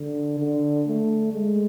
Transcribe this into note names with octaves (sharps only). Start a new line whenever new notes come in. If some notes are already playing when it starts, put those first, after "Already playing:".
Already playing: D3
D3
A3
G#3